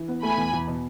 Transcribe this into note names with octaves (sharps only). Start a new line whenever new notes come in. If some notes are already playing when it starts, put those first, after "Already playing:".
Already playing: E3
B3
A3 G#5 B5
E2
E2
B2